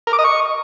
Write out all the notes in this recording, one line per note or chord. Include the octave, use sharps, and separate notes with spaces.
A#4
D6
D#5
C#6